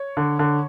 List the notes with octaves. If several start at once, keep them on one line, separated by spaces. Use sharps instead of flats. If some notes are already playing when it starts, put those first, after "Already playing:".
Already playing: C#5
D3
D3